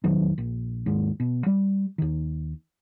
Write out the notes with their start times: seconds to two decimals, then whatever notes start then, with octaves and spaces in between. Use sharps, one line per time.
0.04 F1 E2 D#3 F#3
0.38 A#1
0.86 D#2 G#2
1.20 B2
1.46 G3
1.98 D#2 D#3